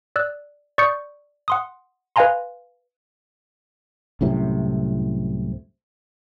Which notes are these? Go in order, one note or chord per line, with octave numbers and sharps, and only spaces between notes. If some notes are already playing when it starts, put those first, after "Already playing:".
D5 E6 F#6
D5 C#6 D#6 G6 C#7
F#5 C6 D#6
B4 D#5 F5 G#5 A#5 C6
C2 F#2 A2 C3